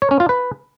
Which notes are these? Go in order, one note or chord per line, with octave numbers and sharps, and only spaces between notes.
C#5
C#4
F4
B4